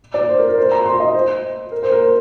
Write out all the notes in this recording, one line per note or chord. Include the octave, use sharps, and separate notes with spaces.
D5
C5
A#4
A#4
C5
A#5
C6
D#5
C5
A#4
C5
A#4
C5